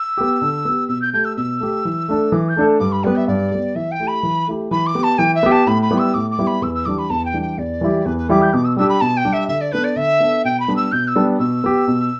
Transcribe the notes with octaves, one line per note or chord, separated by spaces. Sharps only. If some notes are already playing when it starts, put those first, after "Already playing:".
Already playing: E6
B3 G4
D3
B3 G4
B2 E6
G6
A3 G4 G6
E6
B2 E6
A3 G4
E3
A3 D4 A4
E3 D6
G6
A3 D4 A4
G2 D6
B5
G3 B3 B4
E5
G2 D5
G3 B3
E3 E5
G5
A3 E4 G4
B5
E3
A3 E4 G4
E3 B5
D6
B3 G4
A5
E3 G5
E5
B3 G4
A5
A2 B5
B5
G3 B3 E4 G4
E6
A2 D6
D6
G3 B3 E4 G4
B5
E2 E6
E6
E3 G3 D4 G4 D6
B5
E2 A5
G5
E3 G3 D4 G4
G5
E2 D5
E3 G3 E4 G4
E2 B4
B4
E3 G3 E4 G4 D6
G6
B2 D6
E6
G3 D4 G4 E6
B5
B2 A5
G5
G3 D4 G4
E5
D3 E5
D5
B3 D4 A4 B4
D5
D3 E5
B3 D4 A4
B2 G5
B5
G3 B3 D4
E6
B2 G6
E6
G3 B3 D4
B2 E6
B3 G4
B2